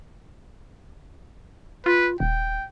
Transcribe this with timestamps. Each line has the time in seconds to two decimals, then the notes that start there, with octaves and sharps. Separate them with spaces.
1.86 F4 B4
2.20 D#1 G5